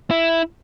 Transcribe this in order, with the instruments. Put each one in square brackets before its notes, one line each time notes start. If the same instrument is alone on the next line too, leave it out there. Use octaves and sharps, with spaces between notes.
[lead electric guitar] E4